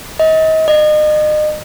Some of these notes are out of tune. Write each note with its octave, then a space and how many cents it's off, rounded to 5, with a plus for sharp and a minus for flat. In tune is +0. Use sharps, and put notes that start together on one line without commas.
D#5 +35
D#5 -35